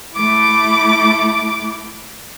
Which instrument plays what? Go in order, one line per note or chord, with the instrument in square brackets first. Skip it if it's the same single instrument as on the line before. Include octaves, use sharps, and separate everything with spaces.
[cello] A3 E4 [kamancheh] D6